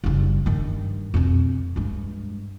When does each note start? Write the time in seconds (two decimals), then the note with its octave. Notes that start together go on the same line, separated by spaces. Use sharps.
0.04 F#1 G3
0.46 G2 D#3
1.14 F2 B2
1.76 G2 G#3